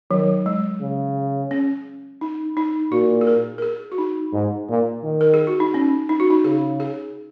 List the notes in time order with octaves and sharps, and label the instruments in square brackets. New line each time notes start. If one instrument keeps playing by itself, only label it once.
[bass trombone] D#3 [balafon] F#3
[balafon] G#3
[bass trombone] C#3
[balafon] C#4
D#4
D#4
[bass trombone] A#2 [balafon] F#4
[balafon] G#4
A#4
A#4
G#4
F#4
D#4
[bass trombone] G#2
A#2
D#3
[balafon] A#4
G#4
F#4
D#4
C#4
D#4
F#4
D#4
[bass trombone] C#3 [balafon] G#4
[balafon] G#4